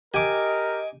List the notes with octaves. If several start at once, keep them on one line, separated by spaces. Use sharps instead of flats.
G4 A#4 D#5 G#5 D6